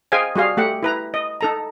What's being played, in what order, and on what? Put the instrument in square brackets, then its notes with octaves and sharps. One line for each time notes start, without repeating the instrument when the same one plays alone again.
[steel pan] G#4 C5 D#5 F5 G5 G#5
G3 F#4 G#4 F5
A3 G4 F#5
E4 B4 A#5
D#5
D#4 A4 A#5